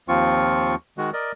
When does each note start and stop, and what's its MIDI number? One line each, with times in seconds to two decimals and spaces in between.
0.08 0.75 39
0.08 0.75 53
0.08 0.75 60
0.08 0.75 65
0.08 0.75 85
0.98 1.11 51
0.98 1.11 56
0.98 1.11 66
1.13 1.32 70
1.13 1.32 74
1.13 1.32 75